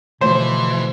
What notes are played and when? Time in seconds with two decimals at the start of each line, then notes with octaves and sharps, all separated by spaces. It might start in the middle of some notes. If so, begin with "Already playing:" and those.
0.21 B2 D3 E3 F3 A3 C5